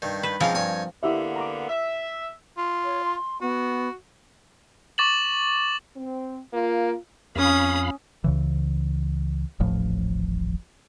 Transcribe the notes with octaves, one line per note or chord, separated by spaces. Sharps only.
G2 D#3
B4
G#2 F3 C4 C#4 A#4 D#5
G2 C#5 G#5
D3 A#3 B3 E4 G4 E5
A#5 C#6 D6
E5
F4
C#5
C6
B3 F#4
C#6 D6 A6 E7 F#7
C4
A#3 F4
F2 C#4 F5 B5 D#6
C#2 C#3 E3
D#1 A1 A2 F3